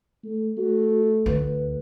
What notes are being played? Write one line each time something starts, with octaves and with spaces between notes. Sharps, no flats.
A3
A3 F#4
D2 B4